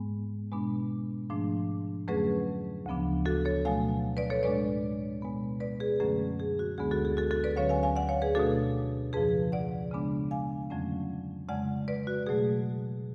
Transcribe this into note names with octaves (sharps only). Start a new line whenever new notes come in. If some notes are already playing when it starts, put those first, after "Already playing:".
Already playing: G#2 G#3 B3
B2 G#3 B3 D4
G#2 F3 A3 D4
F2 D3 F#3 A3 C#4 G#4 B4
D2 C#3 F3 B3 D4
F#4 A4
A4 C#5
B2 F#3 A3 F5 G#5
B4 D5
A4 C#5
A2 G#3 D4 B4 D5
B2 G#3 B3
B4 D5
G#4 B4
F#2 D3 F#3 A3 C#4 G#4
G#4
F#4
D2 D3 G#3 B3 G#4
F#4 A4
G#4
F#4 A4
F#4 A4
B4 D5
D2 D3 F#3 C#4 C#5 F5
F5 G#5
F5 G#5
D5 F#5
C#5 F5
G#4 B4
B2 A3 D4 F#4 A4
F2 C#3 F3 G#4 B4
D5 F#5
C#3 G#3 B3 D4
F5 G#5
F2 D3 F#3 A3 C#4
F2 C#3 G#3 D5 F#5
B4 D5
F#4
B2 F#3 A3 G#4